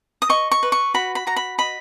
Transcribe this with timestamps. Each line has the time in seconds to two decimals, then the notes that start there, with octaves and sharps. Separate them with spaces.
0.22 D#6
0.29 D#5 C#6
0.52 C#6
0.63 B4
0.72 C#6
0.94 F#4 B5
1.15 B5
1.27 F#4 A#5
1.36 B5
1.58 D#5 B5